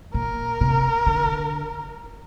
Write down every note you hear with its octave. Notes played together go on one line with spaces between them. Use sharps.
A#2 A#4
C3
D3